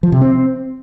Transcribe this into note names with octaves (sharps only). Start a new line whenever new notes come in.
F3
C3
C4